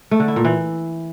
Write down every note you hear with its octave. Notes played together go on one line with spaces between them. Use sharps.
A3
D3
E4
A#2
E3